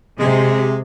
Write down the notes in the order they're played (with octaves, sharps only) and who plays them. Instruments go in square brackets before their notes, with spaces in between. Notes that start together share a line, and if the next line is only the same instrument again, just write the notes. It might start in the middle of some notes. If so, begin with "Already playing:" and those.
[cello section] C3 [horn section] G#3